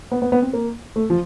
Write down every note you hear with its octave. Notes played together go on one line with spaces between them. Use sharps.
B3
B3
B3
C4
A#3
A3
F3